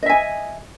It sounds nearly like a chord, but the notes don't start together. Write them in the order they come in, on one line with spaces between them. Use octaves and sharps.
D#5 E5 G#5